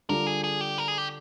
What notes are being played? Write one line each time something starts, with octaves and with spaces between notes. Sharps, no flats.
D3 G3 D4 F4 A#4
G#4
G#4
G4
A#4
G#4
G4